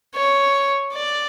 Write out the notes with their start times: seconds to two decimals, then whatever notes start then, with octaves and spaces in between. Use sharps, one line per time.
0.15 C#5
0.94 D5